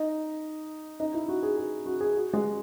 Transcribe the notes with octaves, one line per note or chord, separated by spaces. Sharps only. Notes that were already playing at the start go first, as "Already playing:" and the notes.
Already playing: D#4
D#4
E4
F#4
G#4
G#4
F#4
G#4
F#4
G#3